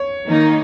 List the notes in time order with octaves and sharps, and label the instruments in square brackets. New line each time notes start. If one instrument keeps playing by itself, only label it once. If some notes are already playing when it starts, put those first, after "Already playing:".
Already playing: [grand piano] C#5
[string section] D#3 A#3 D#4